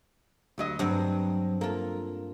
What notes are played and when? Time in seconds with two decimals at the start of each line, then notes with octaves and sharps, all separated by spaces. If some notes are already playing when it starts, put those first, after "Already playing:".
0.58 D2 F#3 D#5
0.79 G2 F#3 C4
1.61 A#3 F4 A4